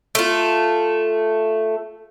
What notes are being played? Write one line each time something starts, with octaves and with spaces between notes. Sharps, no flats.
A3 F4